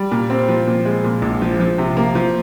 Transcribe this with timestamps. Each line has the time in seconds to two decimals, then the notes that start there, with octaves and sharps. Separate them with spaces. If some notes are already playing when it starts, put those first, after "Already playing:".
Already playing: G3
0.11 A#2
0.30 C4
0.49 F3
0.67 A#2
0.85 G#3
1.04 A#2
1.22 A#1
1.42 F3
1.60 F3
1.78 C3
1.97 A#3
2.15 F3